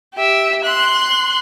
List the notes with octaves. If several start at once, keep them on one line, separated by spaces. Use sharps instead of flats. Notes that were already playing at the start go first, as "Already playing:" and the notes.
G4 E5
C6 F#6